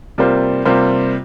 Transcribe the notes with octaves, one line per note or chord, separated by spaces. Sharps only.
C3 G3 A#3 F4 C5
C3 G3 A#3 F4 C5